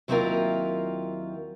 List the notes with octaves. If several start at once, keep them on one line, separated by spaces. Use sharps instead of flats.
D#2 F#3 C4 E4 F4 A#4